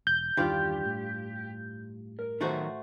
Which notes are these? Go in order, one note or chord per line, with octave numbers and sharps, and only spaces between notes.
E1 G6
E2 G2 D#3 E3 F4 G4 D5
A2
A#4
D#3 F#3 A3 D#4 F#4 C5